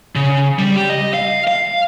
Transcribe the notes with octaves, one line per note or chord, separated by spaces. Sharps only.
C#3
G3
G4
D#5
F5
F5